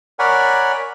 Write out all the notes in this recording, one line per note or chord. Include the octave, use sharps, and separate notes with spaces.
A#4 C#5 D5 F#5 G#5 B5